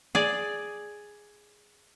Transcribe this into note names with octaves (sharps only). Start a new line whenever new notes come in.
G#4 D5